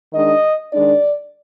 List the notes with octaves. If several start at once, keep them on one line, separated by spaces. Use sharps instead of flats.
D#3 G#3 D4 D#5
D#3 G#3 D4 D5